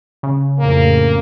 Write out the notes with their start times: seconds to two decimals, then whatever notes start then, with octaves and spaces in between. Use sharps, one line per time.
0.23 C#3
0.59 F2 A2 A#3